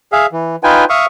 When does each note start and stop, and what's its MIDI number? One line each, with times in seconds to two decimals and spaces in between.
0.12 0.26 68
0.12 0.26 76
0.12 0.26 77
0.33 0.56 52
0.64 0.85 63
0.64 0.85 65
0.64 0.85 71
0.64 0.85 79
0.64 0.85 80
0.90 1.06 76
0.90 1.06 77
0.90 1.06 85
0.90 1.06 87